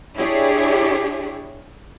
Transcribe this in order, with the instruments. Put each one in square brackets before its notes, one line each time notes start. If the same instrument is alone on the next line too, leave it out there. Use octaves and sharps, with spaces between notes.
[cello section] D4 E4 G4 G#4 C#5